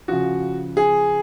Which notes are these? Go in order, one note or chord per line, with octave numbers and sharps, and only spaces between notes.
C#3 F3 F#4
G#4